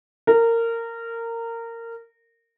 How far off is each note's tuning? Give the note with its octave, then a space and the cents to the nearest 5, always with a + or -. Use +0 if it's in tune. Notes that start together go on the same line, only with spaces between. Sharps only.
A#4 -20